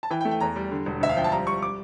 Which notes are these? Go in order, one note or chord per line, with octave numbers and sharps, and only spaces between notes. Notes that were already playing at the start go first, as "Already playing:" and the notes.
A5
E3 G5
G5
A3
G5
E2 A#5
G3
D3
E1
D2 E5
F5
F3 G5
A5
G3 A#5
G3 C#6
D6